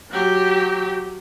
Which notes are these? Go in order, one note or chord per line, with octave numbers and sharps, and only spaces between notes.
F#3 G4